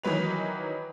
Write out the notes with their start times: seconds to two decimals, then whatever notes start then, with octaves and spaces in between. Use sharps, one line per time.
0.04 D#3 E3 F#3 B4 F7